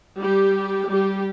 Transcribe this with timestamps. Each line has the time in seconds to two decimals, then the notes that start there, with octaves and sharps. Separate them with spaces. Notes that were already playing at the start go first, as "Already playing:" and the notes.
0.22 G3 G4
0.90 G3 G4